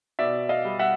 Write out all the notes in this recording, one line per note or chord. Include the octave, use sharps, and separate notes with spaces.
B2 D5 E5
D#5 F5
G3
E5 F#5